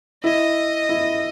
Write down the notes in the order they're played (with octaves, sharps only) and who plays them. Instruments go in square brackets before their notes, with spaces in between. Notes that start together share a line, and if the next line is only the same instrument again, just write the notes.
[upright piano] E4 [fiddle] D#5
[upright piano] E4